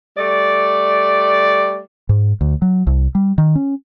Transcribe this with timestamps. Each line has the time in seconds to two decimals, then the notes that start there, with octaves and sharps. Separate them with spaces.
0.17 G3 A3 D5
2.09 G#2
2.41 D2
2.62 F#3
2.87 C2
3.15 G3
3.38 D#3
3.55 C#4